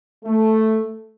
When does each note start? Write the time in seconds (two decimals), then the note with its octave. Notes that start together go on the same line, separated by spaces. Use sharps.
0.24 A3